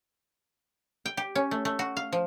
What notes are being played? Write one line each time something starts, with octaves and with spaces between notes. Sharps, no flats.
G5
G4
C#4
A3
A3
F#4
F5
F3